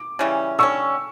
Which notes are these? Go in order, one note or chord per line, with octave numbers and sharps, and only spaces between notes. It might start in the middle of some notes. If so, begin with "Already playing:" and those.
Already playing: D6
C#3 E3 G3 C#4
D3 G3 C#4 C#6 E6